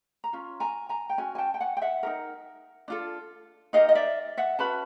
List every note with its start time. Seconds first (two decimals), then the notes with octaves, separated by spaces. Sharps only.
0.24 A#5
0.33 C#4 F4
0.60 G#5 A#5
0.89 G#5 A#5
1.10 G5
1.18 C#4 F#4 G#5
1.35 G#5
1.38 G5 A5
1.54 G5
1.60 F#5 G#5
1.77 G5
1.82 E5 F#5
2.03 D#4 G4 A#4
2.88 D4 F4 A4
3.73 D#4 G4 A#4 D#5 F5
3.89 D#5
3.95 D5 E5
4.37 E5 F#5
4.59 C#4 F#4 B4 A5 B5